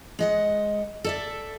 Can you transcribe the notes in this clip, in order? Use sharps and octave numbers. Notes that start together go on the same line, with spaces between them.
G#3 D#5 F#5
A4 D5 E5